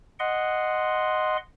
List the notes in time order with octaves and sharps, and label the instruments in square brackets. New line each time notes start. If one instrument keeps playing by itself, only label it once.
[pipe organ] D#5 F#5 C6